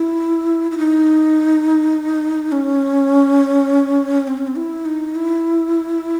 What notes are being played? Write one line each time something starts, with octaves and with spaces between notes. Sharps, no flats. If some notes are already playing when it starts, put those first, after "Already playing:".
Already playing: E4
E4
D#4
C#4
C4
C#4
C4
E4
D#4
E4